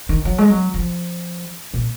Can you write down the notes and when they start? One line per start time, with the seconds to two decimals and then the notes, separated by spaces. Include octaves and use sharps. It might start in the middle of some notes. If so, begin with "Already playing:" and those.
0.09 D#3
0.25 F#3
0.38 G#3
0.50 F#3
0.74 F3
1.74 A#2